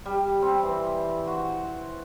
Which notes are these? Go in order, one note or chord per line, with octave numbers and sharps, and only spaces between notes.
G3
C4
E3
F#4